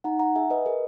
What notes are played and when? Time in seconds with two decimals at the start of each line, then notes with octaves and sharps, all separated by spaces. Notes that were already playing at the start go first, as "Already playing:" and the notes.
0.04 D#4 F#5 A#5
0.19 F#5 A#5
0.35 G#4 E5 G#5
0.50 B4 D#5
0.66 G#4 A#4